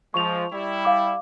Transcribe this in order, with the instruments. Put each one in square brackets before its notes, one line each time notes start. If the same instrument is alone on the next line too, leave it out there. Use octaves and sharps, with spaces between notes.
[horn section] F3 G#3 [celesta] C#6 F7
[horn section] G3 E4
[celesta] F5 D6